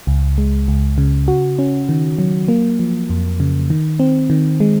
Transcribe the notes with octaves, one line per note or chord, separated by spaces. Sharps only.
C#2
G#3
C#2
C#3
F#4
C#4
D#3
F#3
A#3
F3
F2
C#3
D#3
C4
D#3
G#3